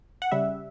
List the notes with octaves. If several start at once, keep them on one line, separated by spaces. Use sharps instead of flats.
F#5
C#3 G3 E5